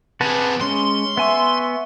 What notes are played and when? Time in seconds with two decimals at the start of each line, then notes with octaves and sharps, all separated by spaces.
0.21 C3 G#4 B4 F#5 A5
0.61 G#3 C#4 C6
1.17 B3 E5 G#5 C#6